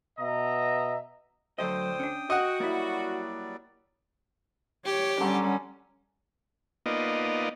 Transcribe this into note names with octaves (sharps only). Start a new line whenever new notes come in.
B2 B3 D#5 E5 A#5
D2 D3 F#3 A4 C5 D#5 G5 D#6
C#4 D4
F#4 D#5 F#5
F#3 G3 A#3 E4 D5
G4 C#5
D3 F#3 G3 C#4
A#3 B3 D#4 F4 D5 D#5